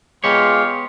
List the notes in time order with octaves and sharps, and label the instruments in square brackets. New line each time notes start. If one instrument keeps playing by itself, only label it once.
[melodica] G#3 [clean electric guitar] B3 G4 C#5 [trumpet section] F4 C6 D6